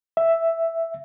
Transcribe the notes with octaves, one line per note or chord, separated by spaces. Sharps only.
E5